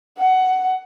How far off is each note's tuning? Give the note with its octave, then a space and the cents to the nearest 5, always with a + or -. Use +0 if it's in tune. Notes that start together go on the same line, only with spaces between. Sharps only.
F#5 +15